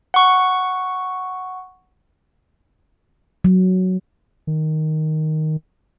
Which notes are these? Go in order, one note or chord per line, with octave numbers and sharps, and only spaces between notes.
F#5 C#6
F#3
D#3